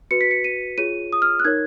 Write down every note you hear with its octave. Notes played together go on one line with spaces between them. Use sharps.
F#4 B4 C#7
B6
C#7
D#7
F4 G#4 C#5 D#7
D#6
F6
F#6
D#4 A#4 C#5 G#6